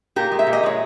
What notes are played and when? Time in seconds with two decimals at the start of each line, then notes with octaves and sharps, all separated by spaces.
0.16 A#2 G4 A#4
0.32 G#3
0.39 E5
0.47 A#2
0.53 D#5
0.63 G#3 C#5